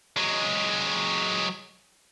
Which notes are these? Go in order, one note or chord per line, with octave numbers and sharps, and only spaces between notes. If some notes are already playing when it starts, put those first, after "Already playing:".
F#3 G#3